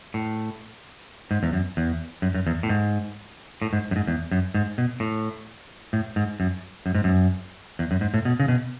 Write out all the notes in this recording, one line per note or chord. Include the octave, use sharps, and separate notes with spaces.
A2
G#2
E2
F#2
E2
F#2
F#2
E2
A2
G#2
A2
G#2
F#2
G#2
E2
F#2
G#2
B2
A2
A2
G#2
F#2
F#2
G#2
F#2
E2
F#2
G#2
A2
B2
C#3
B2